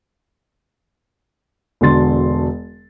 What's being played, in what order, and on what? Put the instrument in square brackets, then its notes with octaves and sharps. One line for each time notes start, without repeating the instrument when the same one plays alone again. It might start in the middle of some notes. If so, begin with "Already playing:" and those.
[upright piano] E1 D3 F#4 A5 C6 A6